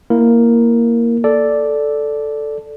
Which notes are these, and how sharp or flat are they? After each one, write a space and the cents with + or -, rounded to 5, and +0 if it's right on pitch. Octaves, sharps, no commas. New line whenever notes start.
A#3 +0 E4 +0 A#4 +0
A4 +0 D5 -5